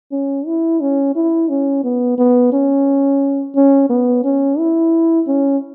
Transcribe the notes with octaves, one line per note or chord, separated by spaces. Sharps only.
C#4
E4
C#4
E4
C#4
B3
B3
C#4
C#4
B3
C#4
E4
C#4